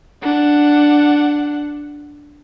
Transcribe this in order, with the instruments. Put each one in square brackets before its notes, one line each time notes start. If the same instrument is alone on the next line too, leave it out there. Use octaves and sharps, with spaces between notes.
[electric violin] D4 F#5